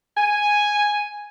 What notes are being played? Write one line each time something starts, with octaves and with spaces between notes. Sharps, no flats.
G#5